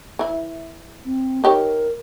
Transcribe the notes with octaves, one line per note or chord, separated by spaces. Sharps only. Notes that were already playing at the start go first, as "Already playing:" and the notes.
E3 E4
C4
D#4 G4 A#4 C#5